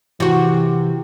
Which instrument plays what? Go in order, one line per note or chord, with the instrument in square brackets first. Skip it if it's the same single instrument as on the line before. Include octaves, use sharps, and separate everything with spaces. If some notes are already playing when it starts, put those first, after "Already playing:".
[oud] C3 F#4 [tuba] E3